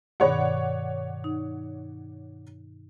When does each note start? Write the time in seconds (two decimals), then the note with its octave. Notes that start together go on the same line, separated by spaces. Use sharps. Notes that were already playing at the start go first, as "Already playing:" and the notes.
0.20 G2 B2 D#3 C#5 D5 F#5
1.24 D#4